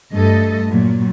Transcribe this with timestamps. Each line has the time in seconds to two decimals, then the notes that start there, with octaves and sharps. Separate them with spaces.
0.13 G2 A3 A4 D#5
0.69 A#2 F#3